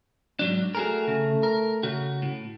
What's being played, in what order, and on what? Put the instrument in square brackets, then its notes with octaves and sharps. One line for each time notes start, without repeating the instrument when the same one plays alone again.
[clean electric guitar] G#2 F#3 D4
[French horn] A3 [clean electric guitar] F#4 G#4 A#4
[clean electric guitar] C#3
A#4
C#3 F#4
A2